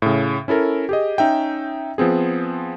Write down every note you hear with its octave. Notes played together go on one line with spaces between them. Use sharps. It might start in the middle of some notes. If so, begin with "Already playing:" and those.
A2 C#3
C#4 E4 A4 A#4
G4 G#4 D#5
C#4 D#4 E5 G5
F3 B3 C4 G#4